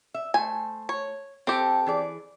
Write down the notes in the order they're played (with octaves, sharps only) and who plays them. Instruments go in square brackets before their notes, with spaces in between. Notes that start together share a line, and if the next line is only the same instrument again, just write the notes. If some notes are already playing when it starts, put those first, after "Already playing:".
[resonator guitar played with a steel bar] E5
[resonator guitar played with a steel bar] A3 C5 [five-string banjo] G#5
[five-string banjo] C#5
[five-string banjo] C4 G4 [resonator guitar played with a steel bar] A4
[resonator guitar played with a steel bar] E3 G#4 D5